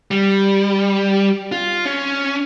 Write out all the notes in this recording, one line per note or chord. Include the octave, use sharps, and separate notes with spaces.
G3
F4
C#4